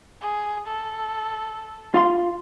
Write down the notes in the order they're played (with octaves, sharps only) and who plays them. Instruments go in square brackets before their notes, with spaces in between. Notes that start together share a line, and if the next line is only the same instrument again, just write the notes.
[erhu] G#4
A4
[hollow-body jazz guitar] F4 F5 C6